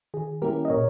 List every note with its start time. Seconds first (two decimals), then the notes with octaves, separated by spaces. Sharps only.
0.14 D#3 G#4
0.42 G3 A#3 C#4 E4 G4 A#4
0.65 D#5
0.70 A#2 A#4 C#5